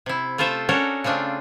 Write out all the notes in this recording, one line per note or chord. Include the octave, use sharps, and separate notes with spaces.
C3 E4
A3 F4 A4 C5 E5
C#4 D4 F#4 A4 A#4 C#5
C#3 A3 C4 D4 F4